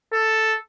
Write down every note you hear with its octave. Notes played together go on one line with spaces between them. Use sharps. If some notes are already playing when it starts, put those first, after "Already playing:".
A4